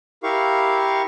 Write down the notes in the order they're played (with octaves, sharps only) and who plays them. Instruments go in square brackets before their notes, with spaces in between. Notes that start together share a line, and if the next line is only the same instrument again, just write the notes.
[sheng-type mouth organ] E4 G4 A#4 F5 C#6